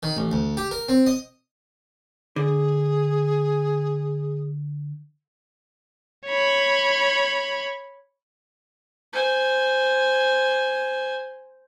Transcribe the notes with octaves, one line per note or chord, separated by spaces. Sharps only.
D#3
A1
D2
G4
A#4
C4
D#5
D3 G#4
C#5 B5
C5 G#5